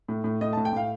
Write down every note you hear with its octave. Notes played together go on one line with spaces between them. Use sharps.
A2
A2
A2 D#5
A2 A5
G5
A2 F5